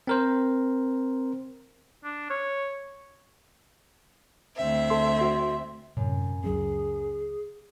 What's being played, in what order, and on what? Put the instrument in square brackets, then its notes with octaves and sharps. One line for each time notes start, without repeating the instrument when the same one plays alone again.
[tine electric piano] C4 A#4 C5
[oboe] D4
C#5
[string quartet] D2 C4 E5
[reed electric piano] A4 C6
F#4 C6
[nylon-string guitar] F#2 [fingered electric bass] A2 C3
[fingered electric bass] C#2 F#3 C#4 [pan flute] G#4